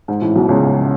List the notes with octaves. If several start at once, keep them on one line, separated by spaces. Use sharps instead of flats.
G#2
A1 A2
B1 B2
C#2 C#3